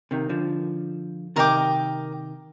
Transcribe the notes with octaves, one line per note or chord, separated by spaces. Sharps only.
C3 D#3
D3 F3
C3 D#3 A#4 D#5 G5 D6